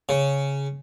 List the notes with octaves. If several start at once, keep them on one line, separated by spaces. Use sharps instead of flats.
C#3